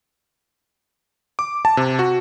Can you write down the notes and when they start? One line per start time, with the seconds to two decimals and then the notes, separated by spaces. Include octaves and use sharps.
1.39 D6
1.65 A5
1.77 C3
1.99 F#4